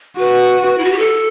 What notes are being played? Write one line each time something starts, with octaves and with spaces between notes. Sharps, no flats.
F#4 B4
E4
F#4
G4
A4